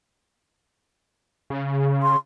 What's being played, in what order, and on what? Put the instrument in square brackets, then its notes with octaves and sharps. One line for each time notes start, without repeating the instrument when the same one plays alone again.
[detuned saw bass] C#3
[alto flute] C6